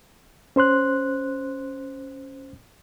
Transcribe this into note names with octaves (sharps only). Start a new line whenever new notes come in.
C#4 C5 C6 F#6